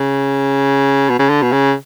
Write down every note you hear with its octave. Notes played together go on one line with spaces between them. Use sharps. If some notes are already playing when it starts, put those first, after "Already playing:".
Already playing: C#3
B2
C#3
D3
B2
C#3